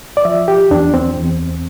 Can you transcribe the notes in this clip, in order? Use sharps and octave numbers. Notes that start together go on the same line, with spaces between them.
D5
F3 E5
G4
E2 D4
C4
E2